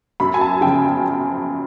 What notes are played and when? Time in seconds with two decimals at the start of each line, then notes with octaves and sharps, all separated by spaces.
0.20 F#2 B5
0.34 G#5
0.41 A5
0.61 C#3 F3 G5
0.82 G#5